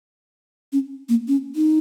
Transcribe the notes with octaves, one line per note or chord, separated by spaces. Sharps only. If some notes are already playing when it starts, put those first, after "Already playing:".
C#4
A#3
C#4
D#4